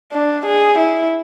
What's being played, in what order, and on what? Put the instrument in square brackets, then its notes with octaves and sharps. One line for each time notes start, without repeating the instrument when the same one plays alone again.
[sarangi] D4
G#4
E4